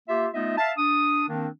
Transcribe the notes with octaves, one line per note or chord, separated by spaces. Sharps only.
A#3 F4 G4 E5
A3 B3 D#4 F4 D#5 E5
E5 F5 A5
D4 D#6
D#3 A#3 C4 D4